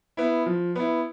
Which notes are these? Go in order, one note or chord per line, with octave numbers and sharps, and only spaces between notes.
B3 E4
F3
B3 E4